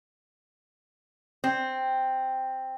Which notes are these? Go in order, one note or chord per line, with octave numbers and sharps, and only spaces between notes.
C4